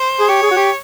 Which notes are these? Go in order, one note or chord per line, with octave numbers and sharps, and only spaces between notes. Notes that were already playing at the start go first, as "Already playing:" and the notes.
Already playing: C5
G#4
G4 C#5
G#4
F#4
G4